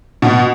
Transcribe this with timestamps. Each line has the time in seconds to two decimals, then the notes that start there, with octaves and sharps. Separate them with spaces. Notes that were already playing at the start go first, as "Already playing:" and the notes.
0.22 B2